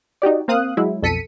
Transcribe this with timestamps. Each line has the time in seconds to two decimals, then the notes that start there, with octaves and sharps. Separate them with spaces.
0.22 D#4 F#4 G4 D5
0.48 A#3 C4 F5 D#6 F#6
0.77 F#3 G#3 E4
1.02 B1 F2 A4 B6 C#7 D#7